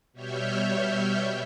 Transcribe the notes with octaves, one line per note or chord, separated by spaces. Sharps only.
B2 G3 C#5 E5 F6 G6